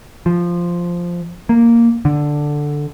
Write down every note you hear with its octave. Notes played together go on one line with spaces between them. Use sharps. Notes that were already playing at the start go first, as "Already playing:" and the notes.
F3
A#3
D3